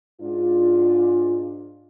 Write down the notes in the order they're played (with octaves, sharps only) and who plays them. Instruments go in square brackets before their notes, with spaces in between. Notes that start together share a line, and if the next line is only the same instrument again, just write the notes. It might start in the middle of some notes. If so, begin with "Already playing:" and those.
[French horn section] G#2 D4 F4